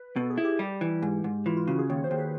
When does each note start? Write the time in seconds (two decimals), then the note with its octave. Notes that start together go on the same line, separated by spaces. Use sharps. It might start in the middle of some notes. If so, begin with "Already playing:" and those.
Already playing: B4
0.16 B2 A4
0.30 G#4
0.38 E4
0.44 G4
0.59 G3 G4
0.81 E3
1.02 G#2
1.24 G#2
1.46 E3 F4
1.57 F4
1.68 C#3 F#4
1.79 G#4
1.90 D#2 C#5
2.04 C5
2.11 D#2
2.18 B4